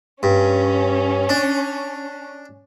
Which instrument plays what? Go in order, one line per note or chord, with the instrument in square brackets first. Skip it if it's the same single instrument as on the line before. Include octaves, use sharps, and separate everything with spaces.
[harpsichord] G2 [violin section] C#4
[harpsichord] D4